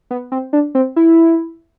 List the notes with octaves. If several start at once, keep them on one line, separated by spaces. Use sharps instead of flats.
B3
C4
D4
C4
E4